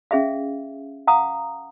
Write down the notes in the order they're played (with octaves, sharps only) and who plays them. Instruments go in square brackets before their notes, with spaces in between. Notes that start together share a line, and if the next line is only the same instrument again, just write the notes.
[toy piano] C#4 G#4 E5 F5
F5 F#5 A#5 D#6